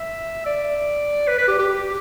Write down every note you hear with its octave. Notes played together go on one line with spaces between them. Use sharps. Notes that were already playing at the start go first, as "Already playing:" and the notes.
Already playing: E5
D5
B4
B4
G4
G4
G4